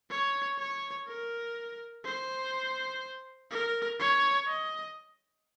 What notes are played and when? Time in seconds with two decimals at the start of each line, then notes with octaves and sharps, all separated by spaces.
0.10 C#5
0.58 C#5
1.07 A#4
2.04 C5
3.50 A#4
4.00 C#5
4.48 D#5